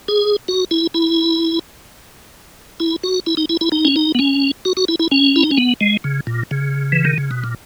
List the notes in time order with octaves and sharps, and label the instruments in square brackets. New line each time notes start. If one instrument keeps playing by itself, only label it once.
[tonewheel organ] G#4
F#4
E4
E4
E4
F#4
E4
D#4
E4
E4
D#4
C#4
D#4
B3
C#4
F#4
F#4
E4
E4
C#4
E4
D#4
C#4
B3
G#3
C#3
A#2
C#3
E3
D#3
C#3
B2
A#2